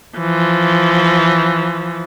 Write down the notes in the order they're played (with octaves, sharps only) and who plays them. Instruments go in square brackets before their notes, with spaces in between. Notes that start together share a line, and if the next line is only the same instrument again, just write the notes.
[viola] E3 F3